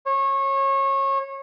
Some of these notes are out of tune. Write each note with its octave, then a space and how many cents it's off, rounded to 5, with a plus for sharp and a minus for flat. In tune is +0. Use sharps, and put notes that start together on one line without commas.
C#5 -25